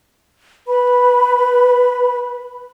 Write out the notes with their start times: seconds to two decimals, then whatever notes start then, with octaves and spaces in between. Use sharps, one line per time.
0.67 B4 B5